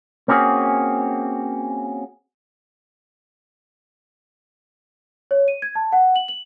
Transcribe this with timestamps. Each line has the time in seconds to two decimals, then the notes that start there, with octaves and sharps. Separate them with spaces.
0.28 A#3 C4 C#4 F#4 G#4
5.31 C#5
5.48 D#7
5.62 G#6
5.75 A5
5.92 F#5
6.16 F#7
6.28 F#7